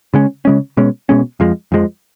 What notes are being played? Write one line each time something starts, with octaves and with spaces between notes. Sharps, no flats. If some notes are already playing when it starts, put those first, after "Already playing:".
C#3 G#3 C#4
C#3 G#3 C#4
B2 G#3 C#4
B2 G#3 C#4
F2 F3 G#3
F2 F3 G#3